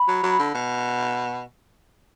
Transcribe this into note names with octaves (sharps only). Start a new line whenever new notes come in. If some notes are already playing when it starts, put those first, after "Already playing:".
Already playing: B5
F#3
F#3
D3
B2